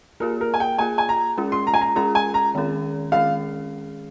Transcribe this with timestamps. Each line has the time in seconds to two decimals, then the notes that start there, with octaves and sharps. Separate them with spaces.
0.20 A#3 F4 G#4 A#4
0.41 A#4
0.54 G#5
0.60 G5
0.79 A#3 F4 G#4 G#5
0.98 G#5
1.09 A#5
1.38 G#3 C#4 F4 G#4
1.52 C6
1.67 A#5
1.74 G#5
1.81 A#5
1.96 G#3 C#4 F4 G#4 A#5
2.15 G#5
2.34 A#5
2.55 D#3 G#3 C#4 G#4
3.12 D#3 G#3 C#4 G#4 F5